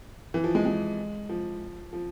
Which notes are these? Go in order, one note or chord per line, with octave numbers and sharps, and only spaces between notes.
E3
F3
G#3
G#3
F3
F3